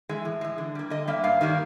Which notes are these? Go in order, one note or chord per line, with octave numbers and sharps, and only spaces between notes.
E3 G#3
A2
E3 G#3
D3
G3 A#3
D3 D#5
G3 A#3 E5
G2 F5
D#3 G3 A#3